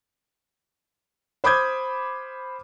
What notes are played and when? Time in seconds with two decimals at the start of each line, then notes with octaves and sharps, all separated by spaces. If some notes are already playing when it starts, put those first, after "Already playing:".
1.44 C5 B5 D6 D#6 G6 G#6